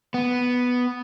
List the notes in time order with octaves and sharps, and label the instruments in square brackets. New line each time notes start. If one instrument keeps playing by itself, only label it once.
[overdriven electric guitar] B3